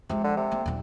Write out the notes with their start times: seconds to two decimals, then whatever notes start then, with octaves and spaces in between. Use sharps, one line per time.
0.09 C3 F3 G#3
0.24 D3
0.37 C3
0.51 A#3
0.66 D#1 F#3